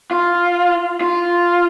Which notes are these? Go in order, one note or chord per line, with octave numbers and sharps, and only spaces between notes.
F4
F4